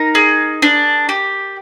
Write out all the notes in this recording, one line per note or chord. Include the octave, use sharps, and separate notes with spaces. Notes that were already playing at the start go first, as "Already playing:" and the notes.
Already playing: D#4 A#4
G#4
D4
G4